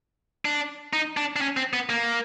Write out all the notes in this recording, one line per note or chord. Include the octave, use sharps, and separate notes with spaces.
D4
D#4
D4
D4
C#4
C4
B3
A#3